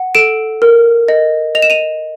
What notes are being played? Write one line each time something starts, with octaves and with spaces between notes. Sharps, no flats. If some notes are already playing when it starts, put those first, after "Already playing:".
Already playing: F#5
A4 D7 E7
A#4
D#5
D#5 F7
E7
D#7 F7